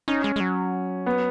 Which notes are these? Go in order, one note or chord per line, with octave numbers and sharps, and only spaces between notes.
C#4 D#4
G#3
G#3
F#3
B3